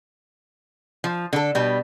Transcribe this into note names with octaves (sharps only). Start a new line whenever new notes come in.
F3
D3 A4
B2 G3